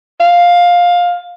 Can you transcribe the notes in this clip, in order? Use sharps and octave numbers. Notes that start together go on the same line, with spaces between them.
F5